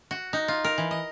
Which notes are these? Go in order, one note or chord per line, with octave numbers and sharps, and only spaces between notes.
F#4
D#4
F4
A#4
E3
D#5